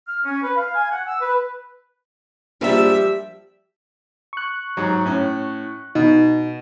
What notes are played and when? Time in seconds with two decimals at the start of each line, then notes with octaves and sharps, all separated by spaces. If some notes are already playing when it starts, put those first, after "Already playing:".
0.07 F6
0.24 C#4
0.43 B4
0.56 F5
0.75 G#5
0.91 F#5
1.07 E6
1.21 B4
2.61 A#1 F3 G3 E5
4.33 C#6 F#6
4.77 G#2 F#3
5.06 A2 C#4
5.95 B2 D#4